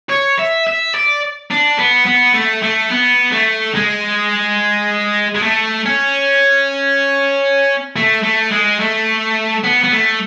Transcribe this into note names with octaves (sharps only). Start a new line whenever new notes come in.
C#5
E5
E5
D5
D4
B3
B3
A3
A3
B3
A3
G#3
G#3
A3
C#4
A3
A3
G#3
A3
B3
B3
A3